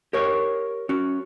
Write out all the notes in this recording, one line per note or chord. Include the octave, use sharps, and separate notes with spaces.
G4 A#4 C#5
C#4 F#4